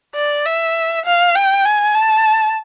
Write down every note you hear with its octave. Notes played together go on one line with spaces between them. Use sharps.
D5
E5
F5
G5
G#5
A5